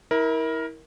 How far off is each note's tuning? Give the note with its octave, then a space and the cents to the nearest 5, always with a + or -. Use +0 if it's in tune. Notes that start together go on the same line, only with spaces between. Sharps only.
E4 -30 A#4 +10